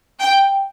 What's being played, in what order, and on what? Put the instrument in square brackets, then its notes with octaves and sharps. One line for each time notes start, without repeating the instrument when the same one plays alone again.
[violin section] G5